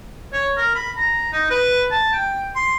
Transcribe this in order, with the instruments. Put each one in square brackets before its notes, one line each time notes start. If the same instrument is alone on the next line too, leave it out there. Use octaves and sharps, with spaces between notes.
[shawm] C#5
A#4
B5
A#5
D#4
B4
A5
G5
C6